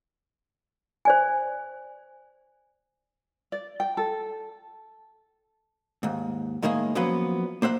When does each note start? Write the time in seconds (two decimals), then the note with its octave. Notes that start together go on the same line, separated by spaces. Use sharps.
1.05 C5 D5 G#5
3.52 D5
3.80 G5
3.97 A4
6.03 D#2 G#2
6.62 A2 D#3 G#3 A#3 G#4
6.95 F3 F#3 A#3 B3 C#4 B4
7.62 A#3 C5 E5 F#5